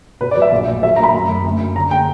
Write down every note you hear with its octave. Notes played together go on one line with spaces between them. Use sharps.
B2 B4
D5
F#3
E5
A#1
A#1
F#3 E5
A#5
A#3 B5
F#2
F#2
D2
D2
D3 A#5
A#3 G5